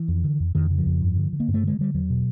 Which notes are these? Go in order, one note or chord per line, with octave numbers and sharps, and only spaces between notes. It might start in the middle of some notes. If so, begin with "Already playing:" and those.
Already playing: E3
F2
D3
F2
F2 D#3
C#3
F3
F2
G2
D3
D3
A#3
G2
A3
D3 G#3
D3 G3
E2 F#3
B2